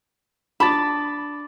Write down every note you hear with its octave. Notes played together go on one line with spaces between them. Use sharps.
D4 A5 B5 D6 A6